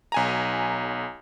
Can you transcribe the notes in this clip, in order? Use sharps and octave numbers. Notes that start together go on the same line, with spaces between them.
B1 G#5 A#5